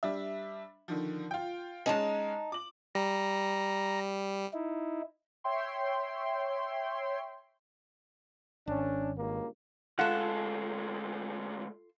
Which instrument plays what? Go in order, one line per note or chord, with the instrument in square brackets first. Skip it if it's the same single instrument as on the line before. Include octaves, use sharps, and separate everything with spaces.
[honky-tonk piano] G3 D4 E5
D3 D#3 F3
F4 G5
[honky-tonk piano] G#3 C#4 [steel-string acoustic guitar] D#4 G#5 A5
[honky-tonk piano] D6 F#7
[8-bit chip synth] G3 [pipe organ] A#5
[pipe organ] D#4 E4
[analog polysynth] C#5 E5 G5 C6
[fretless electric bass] G#1 [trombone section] C#4 D4
[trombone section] C#2 G2 A#3
[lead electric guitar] D2 G#3 [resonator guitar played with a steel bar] F4 A4 [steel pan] F#5